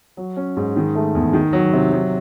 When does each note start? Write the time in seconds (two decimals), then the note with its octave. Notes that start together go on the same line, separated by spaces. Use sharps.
0.17 F#3
0.36 C#4
0.57 G#2
0.76 D#3
0.95 A3
1.15 E2
1.33 D#3
1.53 F#3
1.73 C3
1.92 F#3